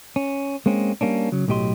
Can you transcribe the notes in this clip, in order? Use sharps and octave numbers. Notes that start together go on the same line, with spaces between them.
C#4
G#3 A#3 C4 C#4
G3 A#3 C#4 D4
C#3 F#3
B1 A2 F#3 G4 D#5 C6